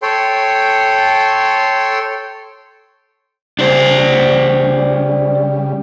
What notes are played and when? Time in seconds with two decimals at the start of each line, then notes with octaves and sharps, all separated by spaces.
0.02 A4 C#5 G5 C6
3.59 C#3 G3 D4 C5